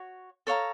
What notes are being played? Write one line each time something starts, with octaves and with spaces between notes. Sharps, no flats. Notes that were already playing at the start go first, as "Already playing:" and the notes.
Already playing: F#4 C#5
A4 C#5 F5 A#5